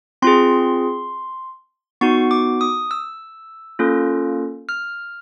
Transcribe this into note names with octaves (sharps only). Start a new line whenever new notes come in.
C4 F4 G#4 C6
B3 D#4 F#4 C#6
D6
D#6
E6
A#3 C#4 F4 A4
F6